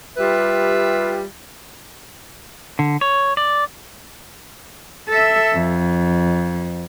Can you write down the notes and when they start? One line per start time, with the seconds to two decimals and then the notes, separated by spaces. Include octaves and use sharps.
0.18 G3 F4 G4 B4 E5
2.79 D3
3.01 C#5
3.37 D5
5.09 A4 E5
5.53 F2